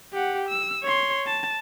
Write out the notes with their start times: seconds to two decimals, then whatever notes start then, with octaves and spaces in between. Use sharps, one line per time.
0.13 G4 F#5
0.48 E6
0.83 C#5 C6
1.26 A5